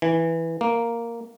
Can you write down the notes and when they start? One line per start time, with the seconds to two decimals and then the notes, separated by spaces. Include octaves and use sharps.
0.02 E3
0.61 A#3